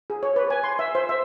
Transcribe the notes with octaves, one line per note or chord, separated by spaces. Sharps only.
G#4
C#5
B4
G#5
C6
E5
C5
E5